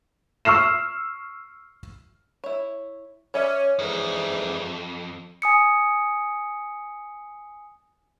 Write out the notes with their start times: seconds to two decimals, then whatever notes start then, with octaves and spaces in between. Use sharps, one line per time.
0.45 C#6 E6 F6 C7 E7
2.44 E4 C#5
3.34 C#4 C#5 D5 E5
3.79 F2 G#2 D3 E3
5.42 G#5 D#6 C#7